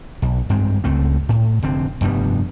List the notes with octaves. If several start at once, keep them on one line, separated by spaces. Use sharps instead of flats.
B1
G2 G#3 C4
C#2 A3 C4
A2
F1 D3 C4
F1 G2 G3 B3